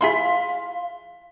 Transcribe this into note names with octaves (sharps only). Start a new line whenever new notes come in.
F3 E4 G#4 F5 C6 B6